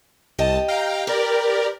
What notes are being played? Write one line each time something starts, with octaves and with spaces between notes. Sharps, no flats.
C2 G4 D#5 A5
F5 G5 A#5
G4 A#4 B4 D5